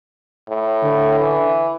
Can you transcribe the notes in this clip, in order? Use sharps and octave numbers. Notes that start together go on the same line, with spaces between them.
A2
D3
E3